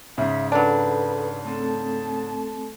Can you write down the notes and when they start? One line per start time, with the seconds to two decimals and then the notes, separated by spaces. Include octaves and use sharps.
0.18 G#2 C#3 E5
0.52 F#3 D4 A4 B4
1.45 A3 C4 A4 A5